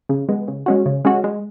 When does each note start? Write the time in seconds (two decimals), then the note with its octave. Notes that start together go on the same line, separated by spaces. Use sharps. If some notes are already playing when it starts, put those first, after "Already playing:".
0.09 C#3
0.29 G#3 B3
0.48 C#3
0.66 G#3 C#4 F#4
0.86 C#3
1.05 G#3 C#4 F#4
1.24 G#3